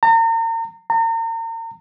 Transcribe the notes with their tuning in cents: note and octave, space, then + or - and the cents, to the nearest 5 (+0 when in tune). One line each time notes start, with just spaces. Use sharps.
A#5 -40
A#5 -40